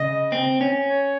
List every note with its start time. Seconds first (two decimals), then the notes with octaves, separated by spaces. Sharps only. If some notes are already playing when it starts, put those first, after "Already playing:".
Already playing: C#3 D#5
0.32 C4
0.61 C#4
0.89 C#5